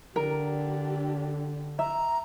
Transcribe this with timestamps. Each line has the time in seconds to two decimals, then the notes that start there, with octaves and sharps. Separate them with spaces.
0.16 D3 D4 G4 A#4
1.79 E5 A#5